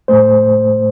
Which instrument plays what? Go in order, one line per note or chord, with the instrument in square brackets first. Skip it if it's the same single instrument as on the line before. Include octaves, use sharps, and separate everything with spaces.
[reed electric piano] A2 A3 C5